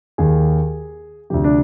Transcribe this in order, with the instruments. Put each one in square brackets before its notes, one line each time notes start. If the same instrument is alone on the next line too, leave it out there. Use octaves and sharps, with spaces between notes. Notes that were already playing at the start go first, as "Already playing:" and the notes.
[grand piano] D#2 D#3 G#4
D2 C3 F3 G4
D4